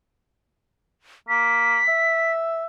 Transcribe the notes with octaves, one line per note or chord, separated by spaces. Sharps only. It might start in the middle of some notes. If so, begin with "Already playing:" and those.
A#3 B6
E5